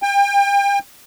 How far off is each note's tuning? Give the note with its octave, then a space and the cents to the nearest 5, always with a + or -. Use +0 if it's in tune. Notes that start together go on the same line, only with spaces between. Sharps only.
G5 +35